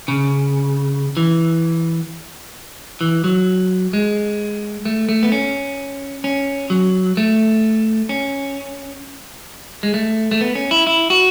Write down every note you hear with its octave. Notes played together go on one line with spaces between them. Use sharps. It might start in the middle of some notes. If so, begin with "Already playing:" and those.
C#3
E3
E3
F#3
G#3
A3
A3
B3
C#4
C#4
F#3
A3
C#4
G#3
A3
A3
B3
C#4
E4
E4
F#4